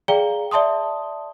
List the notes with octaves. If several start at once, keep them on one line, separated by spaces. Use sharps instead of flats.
G#4 D5 F5 G5 A#5 G7
D5 E5 A5 C6 D#6